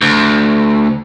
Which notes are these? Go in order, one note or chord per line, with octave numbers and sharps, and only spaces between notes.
D2